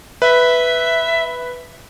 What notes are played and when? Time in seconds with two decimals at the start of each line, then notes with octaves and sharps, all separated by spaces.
0.22 B4 E5